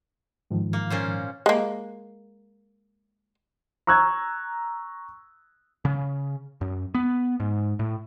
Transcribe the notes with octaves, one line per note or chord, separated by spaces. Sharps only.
G#2 D#3 F3
A#3
A#2 C#4 C5
G#3 A#3
A#5 C#6 E6 F#6 G#6
C#3
F#2
B3
G#2
A2